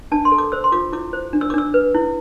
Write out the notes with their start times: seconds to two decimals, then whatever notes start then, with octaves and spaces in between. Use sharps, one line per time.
0.12 D4 A5
0.25 C6
0.32 A4
0.38 D6
0.52 C5 E6
0.64 C6
0.72 F4 D6
0.92 E4 D6
1.13 C5
1.33 D4
1.41 E6
1.50 D6
1.54 D4 E6
1.74 B4
1.95 E4